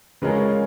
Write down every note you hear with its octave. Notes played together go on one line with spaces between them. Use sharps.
C#3 G#3 C#4 F4 A#4